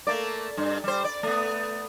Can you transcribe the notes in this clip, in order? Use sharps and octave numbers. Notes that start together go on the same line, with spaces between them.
A3 A#3 D5
G2
G3 C5
D5
A3 B3